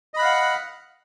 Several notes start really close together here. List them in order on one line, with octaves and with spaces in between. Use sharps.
D#5 B5 F#6 F5 F#5